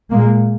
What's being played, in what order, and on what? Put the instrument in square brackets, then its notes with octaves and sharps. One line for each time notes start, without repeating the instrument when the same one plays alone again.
[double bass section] A#2 G#3 A#3